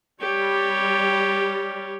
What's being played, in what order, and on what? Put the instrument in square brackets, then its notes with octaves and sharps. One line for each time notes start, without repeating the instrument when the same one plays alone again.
[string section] G3 [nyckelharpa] G4 C#5